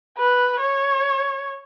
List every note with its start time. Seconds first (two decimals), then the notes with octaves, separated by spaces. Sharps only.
0.18 B4
0.60 C#5